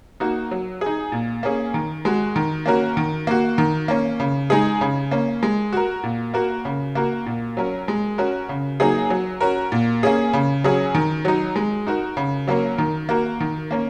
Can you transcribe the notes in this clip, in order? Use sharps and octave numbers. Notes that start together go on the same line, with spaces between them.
A#3 D#4 F#4
F#3
D#4 G#4
A#2
A#3 C#4 G#4
D#3
G#3 F#4
D#3
A#3 C#4 F#4 A#4
D#3
A#3 F#4
D#3
A#3 C#4
C#3
G#3 D#4 G#4
C#3
A#3 C#4
G#3
F#4 A#4
A#2
A#3 F#4 A#4
C#3
A#3 F#4 A#4
A#2
F#3 C#4 A#4
G#3
C#4 F#4 A#4
C#3
F#3 A#3 D#4 G#4
F#3
C#4 F#4 A#4
A#2
A#3 C#4 G#4
C#3
F#3 C#4 G#4
D#3
F#3 D#4
G#3
D#4 F#4 A#4
C#3
F#3 A#3 C#4 A#4
D#3
A#3 F#4 A#4
D#3
A#3 C#4 A#4